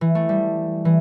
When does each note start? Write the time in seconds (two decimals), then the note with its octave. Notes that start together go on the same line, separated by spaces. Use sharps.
0.01 E3
0.15 A3
0.29 G3
0.85 E3